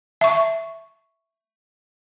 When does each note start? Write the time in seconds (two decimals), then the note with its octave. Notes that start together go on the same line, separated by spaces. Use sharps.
0.21 E5 C#6